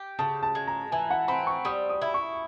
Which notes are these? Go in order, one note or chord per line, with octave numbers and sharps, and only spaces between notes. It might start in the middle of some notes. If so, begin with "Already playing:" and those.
Already playing: G4
C#3 A5
A5
G#3
A#5
E3 G#5
F#5
C4 B5
C#6
G3 D#6
D#6
E4
C#6